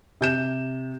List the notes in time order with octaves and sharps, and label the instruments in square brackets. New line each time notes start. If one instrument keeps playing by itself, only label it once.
[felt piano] C3 G6 E7